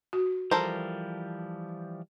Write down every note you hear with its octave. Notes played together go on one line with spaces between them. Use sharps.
F#4
E3 F3 G3 A4 A#4 C5